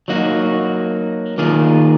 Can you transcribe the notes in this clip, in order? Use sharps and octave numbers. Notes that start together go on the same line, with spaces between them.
F#3 A#3 D#4 F#4
D#3 A#3 F4 G#4